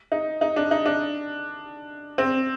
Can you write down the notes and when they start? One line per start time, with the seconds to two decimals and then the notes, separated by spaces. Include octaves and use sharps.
0.12 D#4
0.41 D#4
0.56 D4
0.71 D#4
0.86 D4
2.18 C4